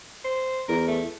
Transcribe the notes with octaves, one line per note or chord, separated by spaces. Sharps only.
C5
E2 A#4
A3